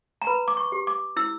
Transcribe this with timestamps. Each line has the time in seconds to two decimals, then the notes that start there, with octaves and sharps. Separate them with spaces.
0.22 A#5
0.27 B4 B5
0.48 D6
0.57 C#6
0.72 G4
0.87 D6
1.17 E4 E6